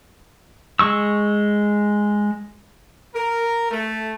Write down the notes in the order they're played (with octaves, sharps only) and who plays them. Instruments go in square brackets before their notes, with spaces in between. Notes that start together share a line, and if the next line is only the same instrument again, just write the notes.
[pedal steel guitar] G#3 C#6 E6
[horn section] A#4
A3